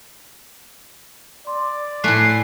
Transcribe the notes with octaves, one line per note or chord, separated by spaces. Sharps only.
D5 C6
A2 A3 G#5 F#6 C7